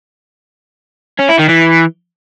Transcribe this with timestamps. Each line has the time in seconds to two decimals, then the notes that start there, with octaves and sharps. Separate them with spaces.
1.19 C#4
1.29 E4
1.39 D#3
1.49 E3